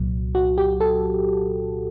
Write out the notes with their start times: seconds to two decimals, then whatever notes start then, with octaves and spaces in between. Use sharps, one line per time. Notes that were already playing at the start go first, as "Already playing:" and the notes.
Already playing: C2 A#2 F#3
0.35 F#4
0.58 G4
0.80 A4